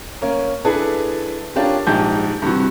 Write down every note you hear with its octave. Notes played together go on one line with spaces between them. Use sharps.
A#3 C#4 A#4
D4 E4 G#4 A4 B4
C#4 D4 F4 G4 A#4
A#1 G#2 G4 A5 G6
G2 C3 E3 F#4